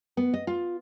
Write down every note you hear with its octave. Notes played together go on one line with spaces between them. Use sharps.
B3
D#5
F4